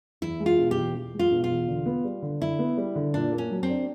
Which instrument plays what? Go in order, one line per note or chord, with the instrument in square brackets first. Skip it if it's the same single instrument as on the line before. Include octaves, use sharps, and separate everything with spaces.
[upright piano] E2 [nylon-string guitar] E4
[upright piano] G#3
[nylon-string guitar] F4
[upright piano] B2
[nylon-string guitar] G4
[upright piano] E2
E2
G#3
[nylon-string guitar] F4
[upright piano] B2
[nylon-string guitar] F4
[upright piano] E2
D3
B3
G3
D3
[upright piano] D3 [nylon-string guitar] E4
[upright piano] B3
G3
D3
[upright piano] A#2 [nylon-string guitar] D4
[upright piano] A#3
[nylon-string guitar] C#4
[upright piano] F#3
[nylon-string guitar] C4
[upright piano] D4